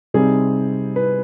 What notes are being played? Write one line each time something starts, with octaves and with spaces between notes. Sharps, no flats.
C3 G3 C4 D#4 G#4
B4